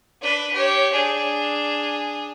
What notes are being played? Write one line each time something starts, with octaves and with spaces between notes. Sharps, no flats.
D4 B4
G4 C#5
D4 G#4